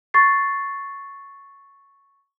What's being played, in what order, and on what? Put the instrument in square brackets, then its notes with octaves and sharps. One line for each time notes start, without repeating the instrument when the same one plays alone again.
[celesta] C#6 A6 C7